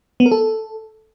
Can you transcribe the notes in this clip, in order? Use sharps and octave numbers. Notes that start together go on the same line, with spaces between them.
B3
A#4
A4